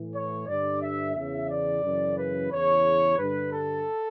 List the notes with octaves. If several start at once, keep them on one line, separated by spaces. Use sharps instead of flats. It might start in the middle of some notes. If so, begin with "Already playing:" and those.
Already playing: A2 E3
C#5
G2 D3 D5
E5
E2 C#3 E3 E5
D5
F#2 C#3 E3
B4
E2 C#3 E3 C#5
G2 D3 B4
A4